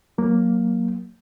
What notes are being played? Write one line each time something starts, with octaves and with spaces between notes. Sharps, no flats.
F#3 A#3